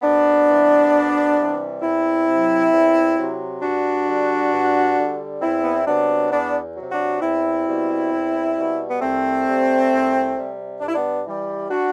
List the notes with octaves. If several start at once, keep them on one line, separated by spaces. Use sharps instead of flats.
D2 B3 D4
C3 E3 G3
D2
C3 E3 G3
E2 C4 E4
C3 F#3
E2
C3 F#3
G2 D4 F#4
D3 G3
G2
D3 G3
E2 C4 E4
B3
C4
C3 F#3 B3 D4
E2 B3 D4
C3 F#3
D4 F#4
E2 C4 E4
B2 G3
E2
B2 G3
B3
C2 A3 C4
C3 G3
C2
C3 G3
G2 D4
E4
B3 D4
E3 G3
D4 F#4